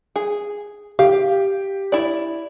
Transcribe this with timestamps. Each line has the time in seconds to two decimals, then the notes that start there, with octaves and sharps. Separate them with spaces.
0.16 G#4
0.99 G4 F5
1.92 E4 D5